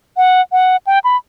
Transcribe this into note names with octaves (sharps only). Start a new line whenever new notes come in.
F#5
F#5
G5
B5